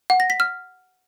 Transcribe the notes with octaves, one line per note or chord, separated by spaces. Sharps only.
F#5
A#6
B6
F6